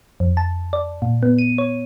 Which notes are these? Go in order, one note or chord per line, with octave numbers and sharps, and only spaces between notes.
F2
A5
D5
A#2
B3
D#7
C#5